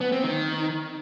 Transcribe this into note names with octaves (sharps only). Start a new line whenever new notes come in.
B3
C4
D#3